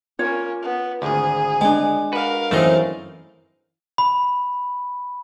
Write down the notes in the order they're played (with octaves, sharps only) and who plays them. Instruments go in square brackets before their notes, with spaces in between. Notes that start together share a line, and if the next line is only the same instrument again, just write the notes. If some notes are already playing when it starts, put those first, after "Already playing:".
[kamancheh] A#3 C#4 [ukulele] F4 C#5
[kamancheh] B3
[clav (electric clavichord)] G#1 D2 [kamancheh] G#4
[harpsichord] G#3 [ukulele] D4 G#5
[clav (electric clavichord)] F#4 B4 [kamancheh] A#4 F5
[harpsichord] F#2 E3 C4 [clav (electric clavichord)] A3 D#4 G#4
[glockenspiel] B5